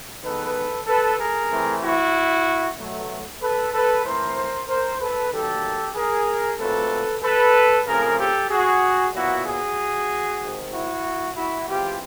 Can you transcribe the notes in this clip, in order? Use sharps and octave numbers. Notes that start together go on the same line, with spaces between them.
D#3 G#3 B3 A4 B4
A4 B4
G#4 A#4
E3 A3 C4
E4 F#4
B2 F#3 A3
A4 B4
A4 B4
E3 A3 C4 A#4 C5
A#4 C5
A4 B4
D#3 F#3 A#3 G4 A4
G#4 A#4
A#2 F#3 A3 C4 A4 B4
A4 B4
C#3 F3 A3 C4 G#4 A#4
G4 A4
F#4 G#4
A#2 F#3 B3 E4 F#4
F#4 G#4
C3 D#3 G#3 C4
E4 F#4
E4 F#4
E3 G#3 C4 F4 G4